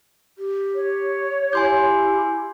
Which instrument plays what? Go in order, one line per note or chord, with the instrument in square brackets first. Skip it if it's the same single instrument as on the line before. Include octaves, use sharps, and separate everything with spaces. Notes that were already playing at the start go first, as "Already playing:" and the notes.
[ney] G4
[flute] C#5
[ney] E4 [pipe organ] G4 [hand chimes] G#5 C6 G6